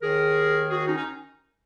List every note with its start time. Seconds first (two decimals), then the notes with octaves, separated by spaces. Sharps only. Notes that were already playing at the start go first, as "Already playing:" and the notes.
0.02 D#2 D#3 G#4 A#4
0.70 F#4 G#4
0.87 C#4 D#4
0.97 D#4